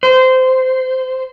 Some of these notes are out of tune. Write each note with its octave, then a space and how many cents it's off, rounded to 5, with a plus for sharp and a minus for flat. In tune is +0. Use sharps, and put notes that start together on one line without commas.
C5 -20